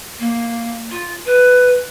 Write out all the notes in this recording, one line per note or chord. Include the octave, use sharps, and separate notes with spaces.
A#3
F4
B4